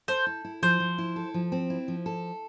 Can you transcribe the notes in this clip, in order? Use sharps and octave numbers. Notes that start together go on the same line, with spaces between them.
A4 C5
E4
E4
F3 C5
F3
E4
A4
F3
C4
E4
F3
A4